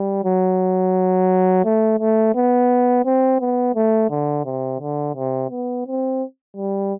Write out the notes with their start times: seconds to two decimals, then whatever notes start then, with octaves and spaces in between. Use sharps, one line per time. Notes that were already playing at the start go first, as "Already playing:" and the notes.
Already playing: G3
0.24 F#3
1.65 A3
1.99 A3
2.35 B3
3.05 C4
3.40 B3
3.75 A3
4.10 D3
4.45 C3
4.80 D3
5.15 C3
5.51 B3
5.87 C4
6.57 G3